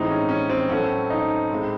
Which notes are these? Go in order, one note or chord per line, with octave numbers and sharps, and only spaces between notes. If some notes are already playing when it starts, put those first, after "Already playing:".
Already playing: A2 E3 G#3 C4 D#4
C#4
C#4
C4
A2 F#3 A3 C4 C#4
D#4
A2 G#3 C4